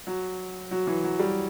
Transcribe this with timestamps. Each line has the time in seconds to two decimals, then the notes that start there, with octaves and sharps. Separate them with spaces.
0.07 F#3
0.71 F#3
0.87 E3
1.04 F#3
1.19 G3